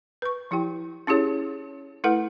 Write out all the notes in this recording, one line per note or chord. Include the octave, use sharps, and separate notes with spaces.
B4 C#6
F3 E4 G4 G5
C#4 E4 G4 G#4 C#5
A3 E4 A4 B4 F#5